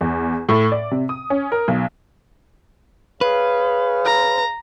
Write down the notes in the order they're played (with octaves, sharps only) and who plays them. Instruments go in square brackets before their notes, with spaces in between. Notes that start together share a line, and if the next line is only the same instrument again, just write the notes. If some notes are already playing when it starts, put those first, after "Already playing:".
[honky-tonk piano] E2
A2
D5
C3
D#6
C#4
A#4
B1
[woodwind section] G#4 C#5 F5 [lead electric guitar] B4
[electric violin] A#5